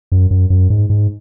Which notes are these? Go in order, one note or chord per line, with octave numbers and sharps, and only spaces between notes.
F#2
F#2
F#2
G#2
G#2